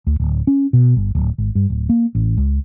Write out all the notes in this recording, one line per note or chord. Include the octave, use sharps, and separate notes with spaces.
D2
D1
C#4
B2
G1
D1
G#1
G2
D1
A#3
A1
C#2